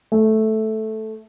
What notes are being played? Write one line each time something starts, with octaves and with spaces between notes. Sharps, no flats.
A3